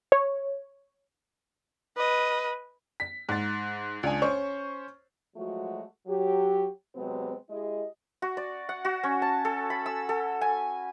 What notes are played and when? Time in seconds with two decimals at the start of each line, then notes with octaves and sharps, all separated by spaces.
0.12 C#5
1.97 B4 D#5
3.00 B6
3.29 G#2 A6
4.03 C#2 D4 G#5
4.22 C#4 C5 C#6
5.36 F3 F#3 G#3 A3 F#4
6.07 F#3 G4
6.96 C3 F#3 G#3 B3 C4
7.50 G#3 E4 G4 G#4 D#5
8.22 F#4
8.37 D5
8.69 F#5
8.85 F#4
9.03 C#4
9.22 A5
9.45 A4
9.70 B5
9.86 E6
10.09 A4
10.41 G#5